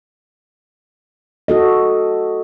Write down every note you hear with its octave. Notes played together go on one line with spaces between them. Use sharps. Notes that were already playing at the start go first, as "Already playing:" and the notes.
F#4 A4 D#5